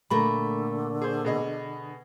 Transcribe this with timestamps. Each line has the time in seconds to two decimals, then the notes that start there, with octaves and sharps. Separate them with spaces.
0.10 A#2 D3 A3 A#4 B5
1.01 G#4 C5
1.25 B2 G#4 D#5